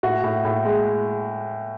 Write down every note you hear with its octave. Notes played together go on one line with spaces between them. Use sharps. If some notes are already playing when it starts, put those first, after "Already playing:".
A2 F#4
A2
A2
G#3